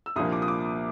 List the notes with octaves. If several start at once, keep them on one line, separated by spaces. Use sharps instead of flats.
E6
C2 A#2 F3 A#3 D4 D#6
D6
D#6
D6